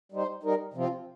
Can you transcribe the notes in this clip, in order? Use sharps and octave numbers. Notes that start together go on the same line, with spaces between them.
G3 D#4 C5
G3 D#4 A#4
C3 F3 C4 F4